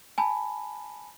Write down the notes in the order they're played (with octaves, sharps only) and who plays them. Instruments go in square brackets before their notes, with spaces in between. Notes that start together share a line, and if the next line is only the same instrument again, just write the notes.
[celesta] G#5 A5 B5